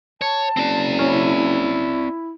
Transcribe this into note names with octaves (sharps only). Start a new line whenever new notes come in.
C#5 A5
F#1 C4 D5
C#4 E4